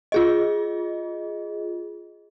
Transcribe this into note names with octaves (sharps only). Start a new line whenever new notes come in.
F4 G#4 D#5